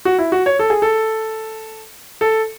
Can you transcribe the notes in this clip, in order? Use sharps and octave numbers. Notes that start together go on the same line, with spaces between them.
F#4
E4
F#4
C#5
A4
G#4
A4
A4